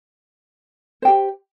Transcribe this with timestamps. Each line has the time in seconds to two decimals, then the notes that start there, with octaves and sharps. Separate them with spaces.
1.02 C5
1.05 G5
1.08 G4